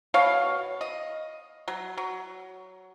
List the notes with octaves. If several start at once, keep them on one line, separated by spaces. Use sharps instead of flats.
B2 C#5 F5
D#5
F#3
F#3